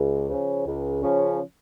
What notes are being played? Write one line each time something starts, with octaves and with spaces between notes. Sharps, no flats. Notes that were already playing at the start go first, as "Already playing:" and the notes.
Already playing: C#2
C#3 F3 C#4
C#2
C#3 F3 C#4